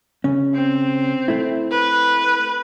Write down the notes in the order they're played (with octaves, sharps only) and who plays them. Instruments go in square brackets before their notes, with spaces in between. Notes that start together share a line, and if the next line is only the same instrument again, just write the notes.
[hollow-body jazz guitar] C#3 C#4
[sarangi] C4
[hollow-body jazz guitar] A3 E4
[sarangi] B4